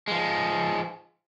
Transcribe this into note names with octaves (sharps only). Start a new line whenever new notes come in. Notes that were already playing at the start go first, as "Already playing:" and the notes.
F3 G#3